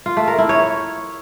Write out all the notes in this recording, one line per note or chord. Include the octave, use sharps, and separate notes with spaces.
F4
A3
A#4
E4
C#5